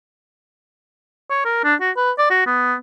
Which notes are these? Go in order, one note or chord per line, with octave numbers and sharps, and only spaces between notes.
C#5
A#4
D4
F#4
B4
D5
F#4
B3